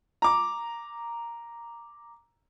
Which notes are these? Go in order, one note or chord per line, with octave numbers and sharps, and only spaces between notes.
A#5 D6